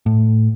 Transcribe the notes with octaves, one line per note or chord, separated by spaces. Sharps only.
A2